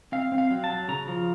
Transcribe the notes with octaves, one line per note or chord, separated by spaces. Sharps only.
C4 F5
C4
F5
F#3
A5
F#3
C#3 A#5
F3